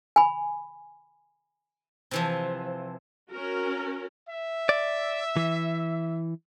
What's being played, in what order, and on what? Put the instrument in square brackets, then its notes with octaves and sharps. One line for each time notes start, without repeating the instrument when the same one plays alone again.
[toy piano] G#5 B5
[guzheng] C3 E3 F3
[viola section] C#4 F#4 A#4
[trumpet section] E5
[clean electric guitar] D5
E3